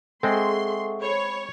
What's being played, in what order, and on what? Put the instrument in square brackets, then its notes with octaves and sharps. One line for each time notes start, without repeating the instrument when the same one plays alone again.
[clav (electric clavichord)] G#3 C4 [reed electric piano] G#4 A4 [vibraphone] E5 F#5 C#6 [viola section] C6
[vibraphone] C5 B5 [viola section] C#5